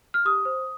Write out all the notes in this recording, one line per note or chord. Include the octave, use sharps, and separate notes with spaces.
F6
G4 D#6
C5